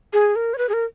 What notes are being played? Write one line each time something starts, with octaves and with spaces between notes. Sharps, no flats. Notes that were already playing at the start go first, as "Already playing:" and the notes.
G#4
A#4
C#5
B4
G#4
A#4